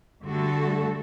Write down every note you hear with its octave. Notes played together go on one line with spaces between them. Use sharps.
D3 G3 A3 F#4 A4